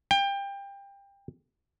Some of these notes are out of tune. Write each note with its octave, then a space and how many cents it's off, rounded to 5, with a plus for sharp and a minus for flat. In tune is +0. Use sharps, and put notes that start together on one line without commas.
G5 +25